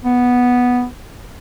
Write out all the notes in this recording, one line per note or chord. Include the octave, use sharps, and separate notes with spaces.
B3